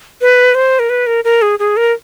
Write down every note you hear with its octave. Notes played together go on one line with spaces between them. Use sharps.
B4
C5
A#4
B4
A#4
A#4
G#4
G#4
A#4